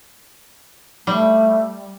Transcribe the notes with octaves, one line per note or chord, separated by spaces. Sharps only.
G3 A3